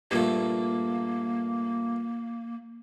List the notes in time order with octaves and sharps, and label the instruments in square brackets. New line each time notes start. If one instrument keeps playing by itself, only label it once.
[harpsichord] G2 A#2 A3 [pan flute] A#3